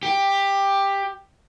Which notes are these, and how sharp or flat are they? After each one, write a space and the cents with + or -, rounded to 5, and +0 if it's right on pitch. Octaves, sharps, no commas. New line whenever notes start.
G4 +10